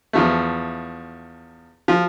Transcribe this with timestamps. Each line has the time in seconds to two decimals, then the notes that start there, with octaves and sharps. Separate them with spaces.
0.13 E2 F3 A3
1.88 F3